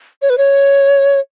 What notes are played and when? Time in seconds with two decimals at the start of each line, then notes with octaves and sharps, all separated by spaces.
0.22 C#5
0.30 B4
0.38 C#5